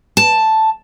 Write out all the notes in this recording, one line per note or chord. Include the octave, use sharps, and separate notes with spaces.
A5